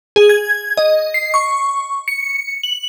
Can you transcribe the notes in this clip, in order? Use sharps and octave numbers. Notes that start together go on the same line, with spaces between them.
G#4
G#6
D#5
C7
C#6
C#7
F#7